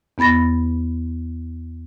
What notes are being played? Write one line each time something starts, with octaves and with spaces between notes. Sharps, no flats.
E2 B3 B5 A6 A#6